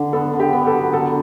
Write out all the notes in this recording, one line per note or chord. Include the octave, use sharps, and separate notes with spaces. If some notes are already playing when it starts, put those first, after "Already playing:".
Already playing: D3
B3 A4
D3
G4
B3
A4
F#3
D3 A4